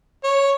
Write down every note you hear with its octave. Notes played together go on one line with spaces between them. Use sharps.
C#5